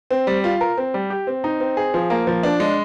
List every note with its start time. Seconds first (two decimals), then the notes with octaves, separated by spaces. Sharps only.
0.11 C4
0.27 G3
0.44 F4
0.61 A#4
0.77 C4
0.94 G3
1.10 G4
1.27 C4
1.44 D#4
1.60 C4
1.77 G#4
1.94 F3
2.10 A#3
2.27 F3
2.43 D4
2.60 G#3